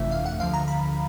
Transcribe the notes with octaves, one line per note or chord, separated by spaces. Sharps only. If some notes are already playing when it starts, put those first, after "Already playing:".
Already playing: G1 F2 C3 E3 A3 E5
F5
F#5
D2 D3 F3 F5
A#5
B5